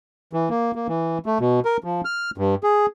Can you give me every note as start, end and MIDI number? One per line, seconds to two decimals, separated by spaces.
0.33 0.49 52
0.50 0.72 58
0.75 0.87 58
0.88 1.18 52
1.26 1.38 57
1.40 1.60 47
1.65 1.77 70
1.84 2.01 53
2.05 2.31 89
2.38 2.55 43
2.63 2.86 68